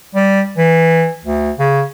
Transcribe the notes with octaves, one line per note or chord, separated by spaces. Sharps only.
G3
E3
D2
C#3